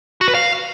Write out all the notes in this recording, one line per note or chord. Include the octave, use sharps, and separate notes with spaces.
F#4
B4
F5